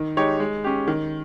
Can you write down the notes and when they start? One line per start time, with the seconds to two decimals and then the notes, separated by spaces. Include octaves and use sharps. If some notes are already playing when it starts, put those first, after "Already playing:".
Already playing: D#3
0.17 G#3 D#4 G4 C#5
0.40 G#3
0.64 C#4 G4
0.88 D#3